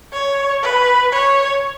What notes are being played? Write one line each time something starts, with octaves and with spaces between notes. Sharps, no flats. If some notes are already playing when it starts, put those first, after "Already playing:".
C#5
B4
C#5